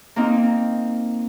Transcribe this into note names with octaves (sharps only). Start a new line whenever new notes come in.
A#3 C4 D#4